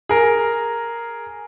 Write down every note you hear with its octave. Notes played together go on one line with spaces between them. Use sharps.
G#4 A#4